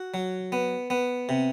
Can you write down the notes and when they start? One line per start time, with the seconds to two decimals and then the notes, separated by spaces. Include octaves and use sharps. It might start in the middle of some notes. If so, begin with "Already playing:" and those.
Already playing: F#4
0.14 F#3
0.52 B3
0.90 B3
1.29 C3